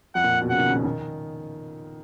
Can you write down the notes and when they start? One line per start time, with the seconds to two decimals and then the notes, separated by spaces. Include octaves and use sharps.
0.15 F2 F#5
0.24 A#2
0.42 B2
0.49 C#3 F#5
0.59 D#3
0.68 C#3
0.76 B2
0.85 D#3